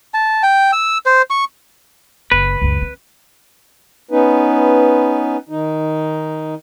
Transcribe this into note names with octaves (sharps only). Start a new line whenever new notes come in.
A5
G5
E6
C5
C#6
F#1 B4
C#2 F#2
C4
B3 C#4 D#4 B4
D#3 D#4